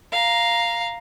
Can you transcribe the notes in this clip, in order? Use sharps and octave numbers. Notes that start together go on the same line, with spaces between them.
F5 A#5